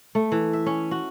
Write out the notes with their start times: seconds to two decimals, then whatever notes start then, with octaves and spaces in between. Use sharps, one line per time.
0.15 A3
0.32 E3
0.53 E5
0.66 C#4
0.91 F#4